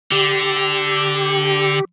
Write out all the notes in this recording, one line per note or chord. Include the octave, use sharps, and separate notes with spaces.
D3 G4